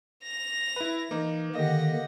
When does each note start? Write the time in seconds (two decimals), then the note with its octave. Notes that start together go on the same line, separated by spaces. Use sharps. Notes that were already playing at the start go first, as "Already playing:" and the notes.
0.23 A#6 F7
0.76 E4 B4
1.11 E3 A#3 D#4
1.55 D3 D#3 A#3 G4 D#5 F#5 A#6